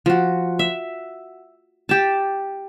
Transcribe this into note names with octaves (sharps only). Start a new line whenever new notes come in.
F3 F#4
E5
G4 A5